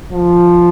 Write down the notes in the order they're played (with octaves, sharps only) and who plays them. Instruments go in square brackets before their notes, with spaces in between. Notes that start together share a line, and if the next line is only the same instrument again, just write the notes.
[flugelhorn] F3